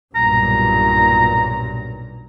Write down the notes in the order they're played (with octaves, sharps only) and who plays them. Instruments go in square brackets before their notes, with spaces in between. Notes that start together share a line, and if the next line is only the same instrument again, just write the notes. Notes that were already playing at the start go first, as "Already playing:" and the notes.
[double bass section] B1 G2 A#2 [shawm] A#5